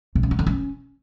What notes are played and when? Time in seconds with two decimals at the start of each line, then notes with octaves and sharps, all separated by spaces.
0.15 C3
0.23 C#3
0.31 B3
0.39 D3
0.47 C#4